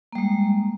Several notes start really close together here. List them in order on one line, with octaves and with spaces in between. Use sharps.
A#3 G3 G#3